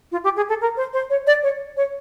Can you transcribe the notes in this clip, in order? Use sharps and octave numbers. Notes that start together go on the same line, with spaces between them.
F4
G4
G#4
A4
A#4
C5
C5
C#5
D5
C#5
C#5